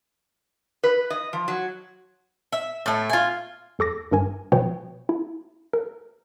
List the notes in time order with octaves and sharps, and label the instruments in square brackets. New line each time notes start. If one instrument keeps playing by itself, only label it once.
[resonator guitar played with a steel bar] B4
D#5
F3
F#3
[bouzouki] E5
A2 A3
F4 G#5
[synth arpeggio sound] E2 A4 D6 A#6
G#1 G2 A#4 G#5
G#1 B2 F3 B4 C#5 G5
E4
A#4